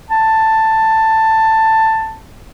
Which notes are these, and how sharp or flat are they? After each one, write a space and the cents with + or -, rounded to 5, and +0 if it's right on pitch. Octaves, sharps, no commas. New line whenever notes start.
A5 +10